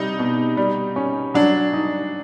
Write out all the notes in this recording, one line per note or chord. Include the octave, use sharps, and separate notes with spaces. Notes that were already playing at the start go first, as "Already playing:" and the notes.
Already playing: C3 G3 D#4
B2
G3
C#4
F#3 D4
D#4